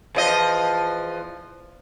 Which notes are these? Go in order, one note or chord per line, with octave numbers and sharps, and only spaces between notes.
E2 F3 D#5